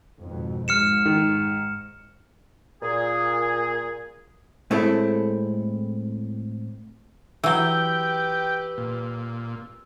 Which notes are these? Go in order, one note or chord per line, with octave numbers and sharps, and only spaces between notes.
G#1 F2 B2
G#2 F6 C#7 E7
D#3
A#2 G#4
A2 G#3 A3 C4 E4 A4
E3 F#3 G4 B4 G5 E6 G7
A#2